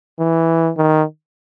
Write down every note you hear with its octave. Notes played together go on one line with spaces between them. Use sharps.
E3
D#3